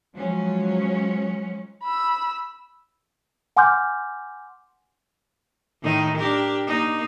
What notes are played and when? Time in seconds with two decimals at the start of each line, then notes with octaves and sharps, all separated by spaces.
0.15 F3 F#3 G#3 C#4
1.84 B5 E6
3.57 F#5 G#5 C6 D6 F6 G6
5.83 A2 D#3 D#4
6.18 D4 G4 A#4
6.67 A#3 D#4